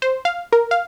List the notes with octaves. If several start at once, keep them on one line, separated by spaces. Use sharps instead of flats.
C5
F5
A#4
F5